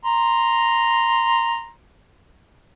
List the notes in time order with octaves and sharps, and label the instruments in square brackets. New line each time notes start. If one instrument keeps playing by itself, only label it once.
[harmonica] A#5 C6